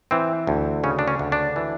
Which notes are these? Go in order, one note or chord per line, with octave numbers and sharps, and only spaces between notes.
E3 C4
D2
C#3 C#4
D4
C#4
D2
D4
E3